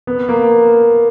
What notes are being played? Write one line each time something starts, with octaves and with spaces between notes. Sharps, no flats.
B3
A#3